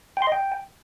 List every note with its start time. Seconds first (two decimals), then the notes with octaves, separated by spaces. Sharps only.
0.17 G5
0.22 C6
0.27 D#5
0.32 G5